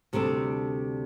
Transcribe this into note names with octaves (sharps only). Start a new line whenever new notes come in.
D2 C3 G3 D4 A4